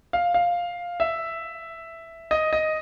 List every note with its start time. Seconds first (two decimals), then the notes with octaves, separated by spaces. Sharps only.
0.13 F5
0.34 F5
1.00 E5
2.31 D#5
2.53 D#5